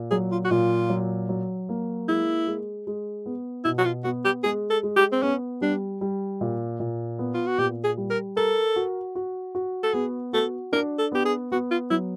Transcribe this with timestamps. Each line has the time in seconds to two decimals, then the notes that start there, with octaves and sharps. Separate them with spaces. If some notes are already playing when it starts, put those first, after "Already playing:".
Already playing: A#2
0.11 F#3 G#4
0.32 F4
0.45 F#4
0.51 A#2 F4
0.90 F#3
1.29 F#3
1.69 A#3
2.08 G#3 E4
2.47 G#3
2.87 G#3
3.26 B3
3.64 B2 E4
3.78 F#4
3.85 F4
4.04 B3 F#4
4.25 G4
4.43 G#3 G#4
4.70 A4
4.83 G#3
4.96 G4
5.12 C4
5.22 B3 C#4
5.61 G3 D4
6.01 G3
6.41 A#2
6.80 A#2
7.19 B3
7.34 F4
7.47 F#4
7.58 A#2 G4
7.84 G#4
7.97 G3
8.10 A#4
8.36 A4 A#4
8.76 F#4
9.15 F#4
9.55 F#4
9.83 A4
9.93 B3 G#4
10.33 F#4 A4
10.72 D4 A#4
10.98 A4
11.12 B3 G4
11.25 G#4
11.52 B3 F#4
11.71 F4
11.90 F#3 E4